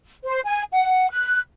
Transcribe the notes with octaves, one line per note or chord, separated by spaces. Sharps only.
C5
G#5
F#5
F#6